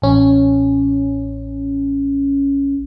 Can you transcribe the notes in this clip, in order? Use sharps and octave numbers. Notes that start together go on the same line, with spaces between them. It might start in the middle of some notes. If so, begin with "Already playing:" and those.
A1 C#4